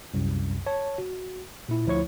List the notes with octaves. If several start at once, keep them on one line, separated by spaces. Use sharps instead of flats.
C2 F#2
C#5 A5
F#4
A#2 E4
D2 F3 E4 C#5 C#6